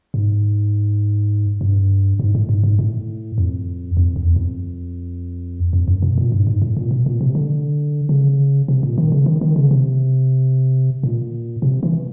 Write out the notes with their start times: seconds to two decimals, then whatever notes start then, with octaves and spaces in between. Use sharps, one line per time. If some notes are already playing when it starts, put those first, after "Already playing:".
0.14 G#2
1.61 G2
2.20 G#2
2.35 A2
2.49 G#2
2.64 G#2
2.79 A2
3.38 F2
3.97 F2
4.16 E2
4.36 F2
5.73 F2
5.88 F#2
6.02 B2
6.18 A#2
6.32 G2
6.47 G#2
6.62 A2
6.77 A#2
6.91 B2
7.06 A#2
7.21 C3
7.35 D3
8.09 C#3
8.68 C3
8.83 A#2
8.98 D#3
9.12 C#3
9.26 D#3
9.41 D#3
9.56 C#3
9.71 C3
11.03 A#2
11.62 C3
11.83 E3